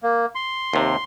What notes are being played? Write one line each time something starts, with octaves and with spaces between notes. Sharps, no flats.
A#3
C6
D#2 C3